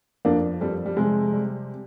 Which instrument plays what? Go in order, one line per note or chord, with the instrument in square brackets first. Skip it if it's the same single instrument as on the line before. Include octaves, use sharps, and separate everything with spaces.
[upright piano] F2 A#3 D4
F2 G3
G3
C3 G#3
G3